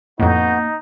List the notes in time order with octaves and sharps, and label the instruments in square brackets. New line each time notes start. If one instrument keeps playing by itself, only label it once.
[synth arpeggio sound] F2 A2 [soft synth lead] A#3 [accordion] B3 F#4 G6 [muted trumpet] D#4